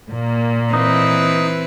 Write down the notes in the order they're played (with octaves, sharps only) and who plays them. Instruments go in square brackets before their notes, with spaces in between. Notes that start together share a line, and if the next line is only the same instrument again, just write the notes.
[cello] A#2 A#3
[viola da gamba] E3 C4 B4 [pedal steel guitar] D#4